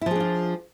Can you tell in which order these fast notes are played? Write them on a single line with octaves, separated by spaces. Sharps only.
E4 F3 G#4 D4 F4